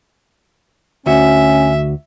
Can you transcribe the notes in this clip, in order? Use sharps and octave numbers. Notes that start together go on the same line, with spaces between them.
D2 C#4 F#4 E5